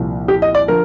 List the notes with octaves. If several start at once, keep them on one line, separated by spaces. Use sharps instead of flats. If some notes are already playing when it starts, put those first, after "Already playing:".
Already playing: C2 A#2 F3
G4
D#5
D5
D3 F3 A#4